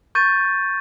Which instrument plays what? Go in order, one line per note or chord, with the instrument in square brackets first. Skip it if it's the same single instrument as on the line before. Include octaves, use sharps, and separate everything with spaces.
[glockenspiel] C#6 G6 A6 D#7